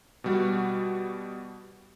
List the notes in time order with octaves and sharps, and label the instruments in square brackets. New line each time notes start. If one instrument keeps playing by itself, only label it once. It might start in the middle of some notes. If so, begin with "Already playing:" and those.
[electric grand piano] B2 G3 F#4